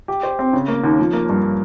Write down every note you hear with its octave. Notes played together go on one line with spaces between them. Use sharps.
G4
C5
C4
C#3
A#3
D#2
F3
A#3
G2